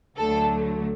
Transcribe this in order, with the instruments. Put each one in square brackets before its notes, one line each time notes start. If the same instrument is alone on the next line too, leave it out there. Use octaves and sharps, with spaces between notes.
[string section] D2 D3 F#3 A3 A4